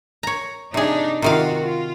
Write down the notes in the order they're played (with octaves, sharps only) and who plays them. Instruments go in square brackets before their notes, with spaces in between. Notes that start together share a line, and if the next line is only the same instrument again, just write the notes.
[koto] C#5 A#5
[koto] C3 G#4 [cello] D4 D#4
[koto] C3 D#3 F5 [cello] F4 F#4
[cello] F4